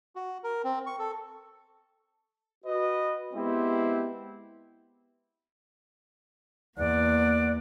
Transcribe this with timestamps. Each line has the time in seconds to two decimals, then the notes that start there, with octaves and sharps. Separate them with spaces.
0.16 F#4
0.44 A#4
0.64 C4
0.86 C#6
0.99 A4
2.65 F#4 B4 D#5
3.33 G#3 B3 C4 E4 G4 C5
6.78 E2 A#3 D5 F#5